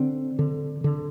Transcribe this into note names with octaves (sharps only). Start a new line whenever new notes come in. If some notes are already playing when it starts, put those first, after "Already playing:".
Already playing: D3 C4
D3
D3